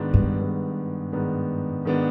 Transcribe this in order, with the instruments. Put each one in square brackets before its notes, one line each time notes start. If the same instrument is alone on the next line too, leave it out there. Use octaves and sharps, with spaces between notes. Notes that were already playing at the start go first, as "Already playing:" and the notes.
Already playing: [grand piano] G#2 D#3 B3 D4
[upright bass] G2
[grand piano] G#2 D#3 B3 D4
G#2 D#3 B3 D4
G#2 D#3 B3 D4